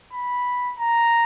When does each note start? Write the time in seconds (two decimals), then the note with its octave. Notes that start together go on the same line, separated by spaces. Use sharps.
0.13 B5
0.79 A#5